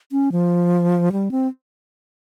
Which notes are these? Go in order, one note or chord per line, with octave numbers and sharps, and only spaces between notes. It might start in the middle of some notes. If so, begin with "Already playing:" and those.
C#4
F3
G3
C4